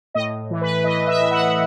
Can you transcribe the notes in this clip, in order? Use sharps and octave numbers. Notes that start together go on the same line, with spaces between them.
A2 D#5
E3
B4
E3 D#5
E5
A2
F#5